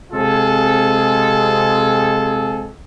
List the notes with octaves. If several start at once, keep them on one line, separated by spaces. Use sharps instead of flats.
C3 G#3 C4 F4 G#4 A4